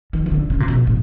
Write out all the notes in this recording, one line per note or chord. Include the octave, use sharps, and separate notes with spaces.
D#3
D#3
D3
C#3
A#2
B2
A2